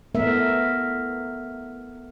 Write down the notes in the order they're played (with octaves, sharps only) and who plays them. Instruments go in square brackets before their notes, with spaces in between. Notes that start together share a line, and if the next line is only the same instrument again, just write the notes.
[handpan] A3 B3 A#4 E5